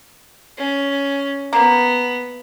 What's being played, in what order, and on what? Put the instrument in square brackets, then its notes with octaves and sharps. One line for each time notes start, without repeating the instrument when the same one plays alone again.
[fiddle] C#4
[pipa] A#3 [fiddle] B3